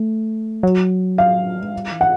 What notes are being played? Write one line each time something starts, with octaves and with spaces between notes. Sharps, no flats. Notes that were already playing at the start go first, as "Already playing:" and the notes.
Already playing: A3
F#3
F5
G#3
G3
E3
F#5